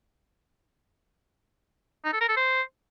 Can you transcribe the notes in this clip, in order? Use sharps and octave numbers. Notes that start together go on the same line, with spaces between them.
D#4
A4
A#4
A4
C5